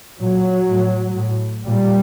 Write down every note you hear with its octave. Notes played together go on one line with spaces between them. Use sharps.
A#2 F#3
A2
A2
A#2 G3